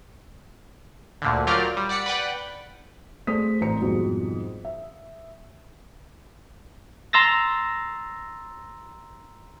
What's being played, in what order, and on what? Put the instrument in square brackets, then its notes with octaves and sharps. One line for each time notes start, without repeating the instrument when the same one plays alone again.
[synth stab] D2 A#2 D3
F#3 F4 G4 A#4 D5 F6
G3
D5 F#5 B6 C#7
B4 D5 F#5 G5 B5
[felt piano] A3 G#4 C5 D5 D#6 B6
A1 C4 C5 A#5 C#7
F2 G#2 B2 G3
E5
[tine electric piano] A#5 C6 E6 A6 A#6